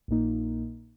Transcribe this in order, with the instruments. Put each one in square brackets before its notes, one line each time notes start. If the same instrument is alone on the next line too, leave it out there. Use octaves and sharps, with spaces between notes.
[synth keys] A#1 A#2 A#3 D#4